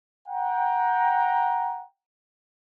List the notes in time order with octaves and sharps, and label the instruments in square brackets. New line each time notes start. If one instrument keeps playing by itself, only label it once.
[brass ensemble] F#5 G5 A#5